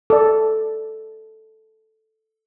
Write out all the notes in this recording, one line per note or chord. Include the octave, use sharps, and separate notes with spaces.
A4 D5